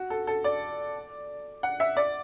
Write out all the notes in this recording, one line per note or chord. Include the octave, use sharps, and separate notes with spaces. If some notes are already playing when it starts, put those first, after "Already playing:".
Already playing: F#4
A4
A4
D5
F#5
E5
D5